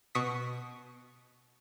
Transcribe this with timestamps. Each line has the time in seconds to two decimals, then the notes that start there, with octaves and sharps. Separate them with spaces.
0.15 B2 C#6 D#6 B6